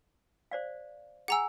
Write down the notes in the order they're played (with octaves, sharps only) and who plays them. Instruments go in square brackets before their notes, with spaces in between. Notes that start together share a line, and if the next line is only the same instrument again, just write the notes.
[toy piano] C5 D5 F5
[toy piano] G#4 G#5 [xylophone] F#5 A#5 E6